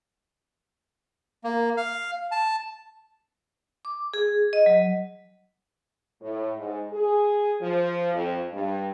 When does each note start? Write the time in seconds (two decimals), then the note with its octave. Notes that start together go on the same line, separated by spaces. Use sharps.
1.44 A#3
1.77 F5
2.31 A5
3.85 D6
4.14 G#4
4.53 D#5
4.66 F#3
6.21 A2
6.58 G#2
6.92 G#4
7.61 F3
8.14 F2
8.53 G2